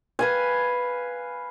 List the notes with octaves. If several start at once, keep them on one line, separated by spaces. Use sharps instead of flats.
B4 F5 G#5